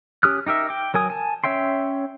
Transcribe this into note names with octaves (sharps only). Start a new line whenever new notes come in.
C#4 G4 D#6 F6 F#6
D#4 G4 A#4 E5
G5 D6
F#3 A#4 G#5 D#6
G#5 A5
C#4 C#5 E5 G5 C6